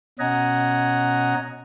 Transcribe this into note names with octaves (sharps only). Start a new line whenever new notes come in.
B2 C#4 D#5 F#5 G#5 A#5